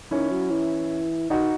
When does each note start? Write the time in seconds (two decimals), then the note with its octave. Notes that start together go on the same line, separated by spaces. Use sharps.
0.11 D#3 C#4 E4
0.30 F#3
0.51 E3
1.30 D#3 D#4 F#4